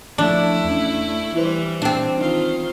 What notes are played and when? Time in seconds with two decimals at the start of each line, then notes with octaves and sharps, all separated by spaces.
0.18 F3 A3 D4 E4
0.65 E2 C#4
1.35 E3 G3 E4 B4 C5
1.82 C4 D4
2.18 D#3 D#4 F4